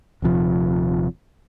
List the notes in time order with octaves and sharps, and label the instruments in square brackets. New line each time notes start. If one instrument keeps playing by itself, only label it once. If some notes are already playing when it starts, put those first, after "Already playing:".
[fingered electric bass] D#1 C3 F3